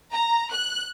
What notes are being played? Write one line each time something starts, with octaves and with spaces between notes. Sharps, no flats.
A#5
F#6